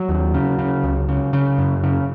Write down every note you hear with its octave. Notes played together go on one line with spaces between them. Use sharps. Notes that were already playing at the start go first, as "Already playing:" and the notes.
Already playing: F#3
D#2
C#3
C#3
C#2
C#3
C#3
F#2
C#3